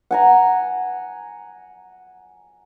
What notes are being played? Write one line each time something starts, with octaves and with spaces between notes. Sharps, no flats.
F#5 G#5 A#5